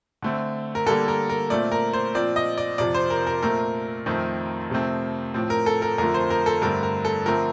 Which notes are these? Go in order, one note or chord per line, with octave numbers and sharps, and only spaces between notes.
D3 A3 C4
A#4
D3 G3 A#3 A4
A#4
A#4
A#2 A3 C4 D5
A#4
C5
A#2 F3 C4 D5
D#5
D5
F2 C3 F3 D5
C5
A#4
A#4
A#2 A3 C4 A#4
F2 D#3 A3 C4
F2 C3 F3 A3 C4
A2 F3 C4
A#4
A4
A#4
F2 D3 F3 A3 A#4
C5
A#4
A4
G2 D3 A3 C4 A#4
A#4
A4
D3 F3 A3 C4 A#4